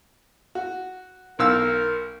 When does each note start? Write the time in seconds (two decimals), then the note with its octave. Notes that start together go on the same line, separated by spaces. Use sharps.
0.55 F#4
1.39 B1 A#4 F5 E6